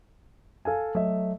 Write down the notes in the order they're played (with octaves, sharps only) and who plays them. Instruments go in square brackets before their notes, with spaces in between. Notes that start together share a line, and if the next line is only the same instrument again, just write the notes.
[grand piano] A4 F5 G#5
[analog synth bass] F#3 [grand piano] A3 D#5 E5